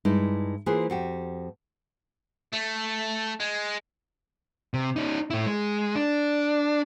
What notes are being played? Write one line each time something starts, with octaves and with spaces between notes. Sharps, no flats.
G2 G#3 D#4 E4
E3 A#3 F4 G#4 B4 C5
F2 F#4 G4
A3
G#3
C3
C#4 D#4
A2 E4
G#3
D4